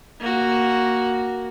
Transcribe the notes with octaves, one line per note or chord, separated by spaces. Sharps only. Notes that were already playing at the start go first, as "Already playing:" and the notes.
A#3 F#4